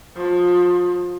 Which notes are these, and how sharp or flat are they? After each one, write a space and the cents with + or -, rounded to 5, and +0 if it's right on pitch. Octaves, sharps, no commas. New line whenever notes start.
F3 +25